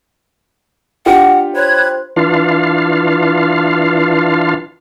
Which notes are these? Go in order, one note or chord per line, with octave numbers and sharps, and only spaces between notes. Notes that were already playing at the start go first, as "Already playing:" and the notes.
D4 F4 G4 F#5
C5 C#5 B5 F#6 G#6
E3 D4 F4 F5